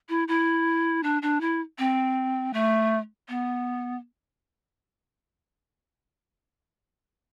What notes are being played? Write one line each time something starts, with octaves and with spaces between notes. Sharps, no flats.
E4
E4
D4
D4
E4
C4
A3
B3